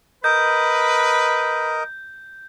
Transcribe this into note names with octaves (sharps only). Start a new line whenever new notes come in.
A#4 B4 D#5 G6